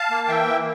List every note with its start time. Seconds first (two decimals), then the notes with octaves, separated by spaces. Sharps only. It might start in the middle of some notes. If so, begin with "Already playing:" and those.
Already playing: F5 A5
0.11 A#3
0.28 E3 E5 G5
0.46 A#3